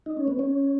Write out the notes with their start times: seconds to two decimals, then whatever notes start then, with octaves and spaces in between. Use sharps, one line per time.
0.06 D#4
0.17 C#4
0.28 B3
0.39 C#4